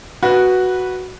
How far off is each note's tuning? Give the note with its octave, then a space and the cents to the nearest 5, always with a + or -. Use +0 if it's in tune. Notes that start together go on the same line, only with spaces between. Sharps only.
F#4 +0 B4 -10